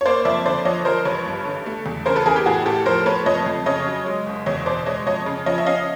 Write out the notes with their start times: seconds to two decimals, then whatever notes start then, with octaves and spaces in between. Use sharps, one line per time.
0.01 C#5
0.06 A#3 C5 D5
0.25 F2 D5 E5
0.46 D3 C5 D5
0.65 F3 C#5 D#5
0.85 F3 A#4 C5
1.05 A1 B4 C#5
1.26 G2
1.45 D3
1.66 A3
1.86 E2
2.06 C#3 A#4 C5
2.16 A4 B4
2.26 E3 G#4 A#4
2.36 G4
2.46 A2 F#4 G#4
2.66 A2 G4 A4
2.86 F3 A#4 C5
3.06 A3 B4 C#5
3.26 F2 C#5 D#5
3.46 F2
3.66 C#3 C#5 D#5
3.86 F#3
4.06 G#3
4.27 F#1
4.46 E2 C#5 D#5
4.66 B2 C5 D5
4.86 G#3 C#5 D#5
5.07 F2 C#5 D#5
5.26 C#3
5.46 F3 C#5 D#5
5.58 E5
5.66 C#4 D#5 F5